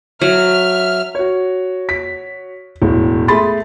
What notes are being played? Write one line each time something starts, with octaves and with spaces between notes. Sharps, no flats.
F#3 E5 F6
F#4 C#5
B6
E1 A2
A3 G#4 B5 C6 A6